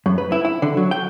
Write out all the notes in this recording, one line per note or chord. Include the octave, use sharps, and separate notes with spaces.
F#2
B4
E4
E4
D3
F#3
G5